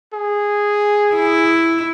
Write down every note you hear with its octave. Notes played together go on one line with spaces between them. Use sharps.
G#4
E4